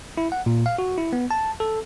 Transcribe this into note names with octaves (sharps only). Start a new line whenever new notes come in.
E4
F#5
A#2
F5
F#4
E4
B3
A5
A4